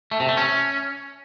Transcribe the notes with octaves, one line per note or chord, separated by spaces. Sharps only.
A3
C3
A3
C#4